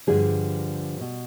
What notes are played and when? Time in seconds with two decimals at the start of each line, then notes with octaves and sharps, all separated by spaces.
0.07 G2 D3 F3 G#4
1.00 B2